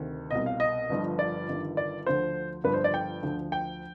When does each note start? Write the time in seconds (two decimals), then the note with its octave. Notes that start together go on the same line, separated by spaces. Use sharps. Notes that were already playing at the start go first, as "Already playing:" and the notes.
Already playing: D2 C3 D#3
0.31 C2 B2 D#5
0.46 F5
0.60 D#5
0.90 G1 G2 F3
1.19 D5
1.48 G1 G2 D#3
1.77 D5
2.06 D2 D3 F3 C5
2.64 G1 G2 F3 B4
2.74 C5
2.84 D5
2.94 G5
3.23 D2 D3 F3
3.52 G5